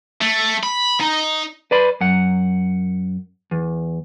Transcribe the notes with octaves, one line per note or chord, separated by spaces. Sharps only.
A3
B5
D#4
B4 D5 B5 C6
F#2 F#5
E2